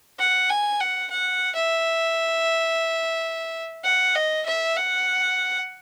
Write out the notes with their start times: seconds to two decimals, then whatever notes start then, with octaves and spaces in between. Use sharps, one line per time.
0.19 F#5
0.50 G#5
0.80 F#5
1.10 F#5
1.56 E5
3.84 F#5
4.15 D#5
4.46 E5
4.76 F#5